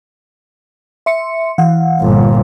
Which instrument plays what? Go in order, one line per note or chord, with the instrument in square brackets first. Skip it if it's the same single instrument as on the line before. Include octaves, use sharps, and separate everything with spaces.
[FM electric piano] E5 C6 C#7
E3 F5 F#5
[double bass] G1 A#2